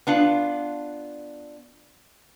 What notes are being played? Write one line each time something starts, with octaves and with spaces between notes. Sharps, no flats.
B3 D4 F4